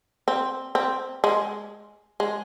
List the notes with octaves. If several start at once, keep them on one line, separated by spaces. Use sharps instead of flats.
C4
C4
G#3
G#3